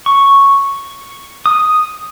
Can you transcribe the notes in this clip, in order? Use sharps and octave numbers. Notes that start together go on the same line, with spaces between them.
C#6
D#6